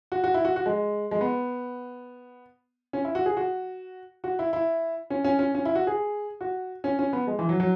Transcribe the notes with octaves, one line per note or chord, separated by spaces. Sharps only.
F#4
F#4
E4
F#4
F#4
G#3
G#3
B3
C#4
E4
F#4
G#4
F#4
F#4
E4
E4
C#4
C#4
C#4
C#4
E4
F#4
G#4
F#4
C#4
C#4
B3
G#3
E3
F#3
F#3